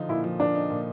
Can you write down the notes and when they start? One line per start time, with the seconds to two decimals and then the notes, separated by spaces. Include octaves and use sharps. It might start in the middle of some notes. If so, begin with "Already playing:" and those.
Already playing: D3 F3 D#4
0.09 A#2 E4
0.24 F3
0.39 A#2 D4
0.55 D#4
0.70 A#2